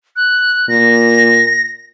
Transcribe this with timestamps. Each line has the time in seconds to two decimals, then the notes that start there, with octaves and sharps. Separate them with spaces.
0.16 F#6
0.69 A#2 A#6